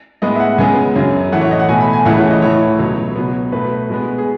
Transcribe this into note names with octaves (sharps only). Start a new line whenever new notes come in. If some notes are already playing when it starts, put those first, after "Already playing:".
A2 G#3 B3 D#5
E5
F#5
C#2 C#3 G#3 B3 G#5
F#2 C#3 F#3
A2 E3 A3 F#5
C#5
D#5
F#5
B2 A3 G#5
B5
G#5
C#2 C#3 E3 A3 F#5
C#5
D#5
A2 E3 A3 C#5
C#2 B2 F#3
B2 F#3 B3
B2 A3 B4
B2 G#3 B3
G#4